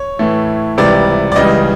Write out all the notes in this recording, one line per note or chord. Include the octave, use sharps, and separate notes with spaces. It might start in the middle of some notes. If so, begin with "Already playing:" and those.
Already playing: C#5
A2 E3 A3
C#2 C3 E3 G3 D5
D5
C#2 C#3 E3 G3 D#5